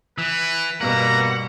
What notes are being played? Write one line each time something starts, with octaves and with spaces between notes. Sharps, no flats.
E3 B4
G2 B2 A#3 B3 F#5 A#5